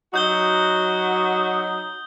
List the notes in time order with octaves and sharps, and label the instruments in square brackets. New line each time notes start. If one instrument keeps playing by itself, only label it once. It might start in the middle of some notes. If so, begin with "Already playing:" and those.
[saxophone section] F#3 D#4 F#4 [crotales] D#6 G6 G7